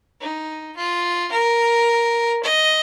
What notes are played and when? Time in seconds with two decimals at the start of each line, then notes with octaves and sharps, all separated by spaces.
0.21 D#4
0.76 F4
1.31 A#4
2.43 D#5